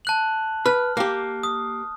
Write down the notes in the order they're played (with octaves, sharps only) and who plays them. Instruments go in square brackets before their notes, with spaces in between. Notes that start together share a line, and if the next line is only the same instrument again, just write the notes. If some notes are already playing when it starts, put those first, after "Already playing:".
[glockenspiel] A5 F#6 F#7
[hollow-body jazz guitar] B4 [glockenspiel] F6
[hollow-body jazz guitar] A#3 G4
[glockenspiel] D#6